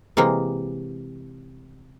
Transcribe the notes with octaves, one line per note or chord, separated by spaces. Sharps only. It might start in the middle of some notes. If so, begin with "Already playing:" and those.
C3 E3 G#3 A#3